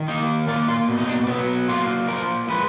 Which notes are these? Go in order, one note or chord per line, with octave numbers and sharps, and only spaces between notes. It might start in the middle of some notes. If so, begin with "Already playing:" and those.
Already playing: D#3
A#3 D#4
A#3 F4
F4
B2
D#4
D4
F#3 B3
A#3 F4
F3 A#4
G#3 B4